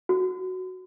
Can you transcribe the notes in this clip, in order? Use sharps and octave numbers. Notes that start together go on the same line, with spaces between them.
F#4